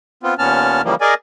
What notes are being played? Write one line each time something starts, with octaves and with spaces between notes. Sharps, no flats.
B3 C4 F4
D#2 A#2 B3 C#4 A5 F6
C#3 E3 F3 G3 A#3
G#4 A#4 D5 D#5 G#5